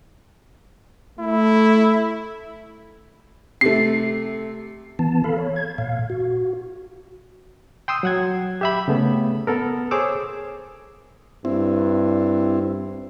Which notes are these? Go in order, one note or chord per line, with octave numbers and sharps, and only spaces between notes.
A3 E4
C3 A3 C7
E3 B3 A5
A4 F5 B5
C#5
G#6
A#2 F5
F#4
G5 C6 D#6 E6
F#3 F#5 G#6
G4 E5 B5
C#3 A3 B3
B3 A4 A#4
G#4 C5 C#5 D6 E6
G2 C4 E4